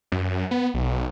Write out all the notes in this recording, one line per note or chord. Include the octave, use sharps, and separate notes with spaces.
F#2
B3
B1